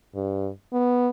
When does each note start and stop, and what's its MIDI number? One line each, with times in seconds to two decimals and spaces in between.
0.15 0.50 43
0.73 1.09 59